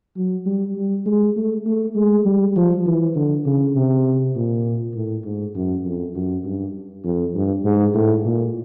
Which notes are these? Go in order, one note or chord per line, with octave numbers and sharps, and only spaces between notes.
F#3
G3
G3
G#3
A3
A3
G#3
G3
F3
E3
D3
C#3
C3
A#2
A2
G#2
F#2
F2
F#2
G2
F2
G2
G#2
A2
A#2